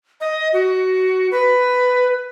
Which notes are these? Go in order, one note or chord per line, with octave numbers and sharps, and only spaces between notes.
D#5
F#4
B4